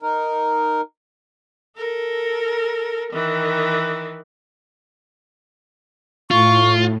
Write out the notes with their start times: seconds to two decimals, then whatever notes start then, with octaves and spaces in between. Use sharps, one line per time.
0.02 D#4 A#4
1.77 A4 A#4
3.12 D#3 E3
6.31 A2 F4 C#6